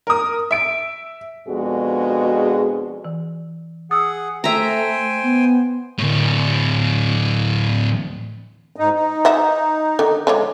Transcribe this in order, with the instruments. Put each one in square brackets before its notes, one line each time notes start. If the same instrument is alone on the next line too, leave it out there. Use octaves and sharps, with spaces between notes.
[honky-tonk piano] A#4 D#6
E5 D7
[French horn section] F2 B2 G#3 D4 F#4 G#4
[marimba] E3
[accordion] G#4 F#5 [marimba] D#6 E6
[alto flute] A3 [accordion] C5 G5 G#5 [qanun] E5 A#5
[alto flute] B3
[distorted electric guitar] D2 A2
[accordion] G#2 D#4
D#4
[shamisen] D#5 E5 F#5
D3 D#3
[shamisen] D3 F3 C#5 [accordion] G#3